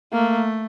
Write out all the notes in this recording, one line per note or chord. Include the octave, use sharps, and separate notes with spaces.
A3 A#3